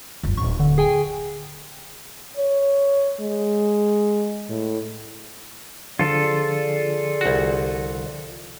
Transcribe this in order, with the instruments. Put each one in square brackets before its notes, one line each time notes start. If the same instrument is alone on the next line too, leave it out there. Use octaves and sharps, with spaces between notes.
[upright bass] F#1 C#2
[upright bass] D1 [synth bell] C#6
[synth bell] D3
G#4 G5 G#5
[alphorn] C#5
G#3
A2
[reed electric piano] D3 F3 [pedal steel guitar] F4 A4 [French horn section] G#4 D5
[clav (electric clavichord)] C2 F#4